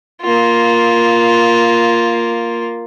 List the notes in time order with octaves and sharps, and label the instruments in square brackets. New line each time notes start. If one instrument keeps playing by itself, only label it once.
[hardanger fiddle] A#3 F4